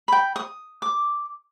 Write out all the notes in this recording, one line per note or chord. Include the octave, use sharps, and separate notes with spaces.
G5 B5
D#6
D6